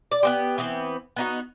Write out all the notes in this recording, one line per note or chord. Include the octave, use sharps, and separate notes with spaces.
D5
B3 C4 G4
E3 B3 C4
B3 D#4 F#4